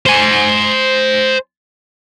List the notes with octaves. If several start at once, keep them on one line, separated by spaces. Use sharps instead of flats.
C5 G#5